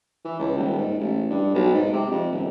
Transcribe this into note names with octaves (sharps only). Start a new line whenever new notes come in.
E3
C#2
D#1
G#2
A1
G2
B1
G#2
C3
F2
D#1